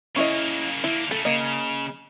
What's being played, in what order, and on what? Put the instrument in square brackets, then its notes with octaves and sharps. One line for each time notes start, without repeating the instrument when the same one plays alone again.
[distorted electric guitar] C#3 A#3 [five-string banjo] C#4 E4 D#5
[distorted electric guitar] D3 A#3 [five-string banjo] E4
[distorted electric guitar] C#3 A3 [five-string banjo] A4
[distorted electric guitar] C#3 [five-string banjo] A#3 D#5